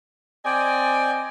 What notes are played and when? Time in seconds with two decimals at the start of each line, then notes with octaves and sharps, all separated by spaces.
0.45 C4 D5 D#5 G5 G#5